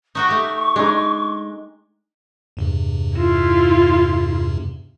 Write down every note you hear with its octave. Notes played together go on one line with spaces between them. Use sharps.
D#4 F#4 G5 C#6
A3 G4
G#3 D4 D#4
E2 G2 C3
E4 F4